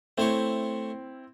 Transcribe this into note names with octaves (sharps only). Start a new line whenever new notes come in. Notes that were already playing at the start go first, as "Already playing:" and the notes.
A3 C4 E4 C5 C#5